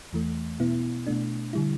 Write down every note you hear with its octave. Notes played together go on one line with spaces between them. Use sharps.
E2 E3 A3
B2 B3 E4
B2 A3 D4
D3 G3 E4